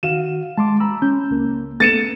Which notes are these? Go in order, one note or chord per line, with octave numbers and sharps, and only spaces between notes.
D#3 F#4 F5 E7
G#3 A5 C6 D6
A#5 B5 E6
C#4 G6
C#2 A#3
A3 B3 A6 C#7 E7